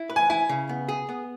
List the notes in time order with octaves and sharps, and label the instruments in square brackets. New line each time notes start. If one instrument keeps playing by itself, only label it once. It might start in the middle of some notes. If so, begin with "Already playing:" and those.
Already playing: [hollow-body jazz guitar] E4
B4
[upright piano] G#5
[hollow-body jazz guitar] E4 [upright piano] G#5
[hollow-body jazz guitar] C#3
B3
G#4
B3